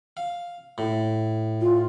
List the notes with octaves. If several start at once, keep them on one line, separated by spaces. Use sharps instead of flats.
F5
A2
F4